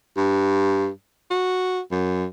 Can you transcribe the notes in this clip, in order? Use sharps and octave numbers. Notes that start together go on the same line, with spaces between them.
G2
F#4
F#2